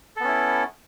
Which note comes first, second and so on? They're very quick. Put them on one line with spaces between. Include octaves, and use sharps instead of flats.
A4 B3 C#4 E4